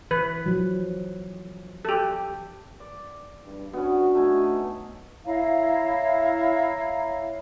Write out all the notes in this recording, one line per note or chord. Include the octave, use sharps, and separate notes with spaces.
E3 B4
F3 F#3
G4 A4
D5
E2 G2 G3
B3 C#4 D4 F#4
A3 D#4 G#5
E4 C#5 F5 A#5